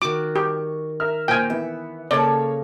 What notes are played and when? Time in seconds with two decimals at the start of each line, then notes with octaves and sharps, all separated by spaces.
0.02 D#3 F#4 D6
0.36 G4 C#6
1.00 A#4 E5 F6
1.28 A#2 C5 G5 G#5 F6
1.50 E3 B3 E5
2.11 C#3 A#3 A4 C#5 D5 A5